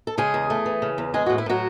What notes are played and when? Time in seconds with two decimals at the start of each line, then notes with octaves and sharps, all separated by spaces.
0.07 A4
0.18 C#3 G#3 G#4
0.34 E2
0.50 A3
0.66 E3
0.82 C#3
0.98 E2
1.14 G#3 G#4
1.26 A2 F#4
1.38 E4
1.46 A2 F#3 F#4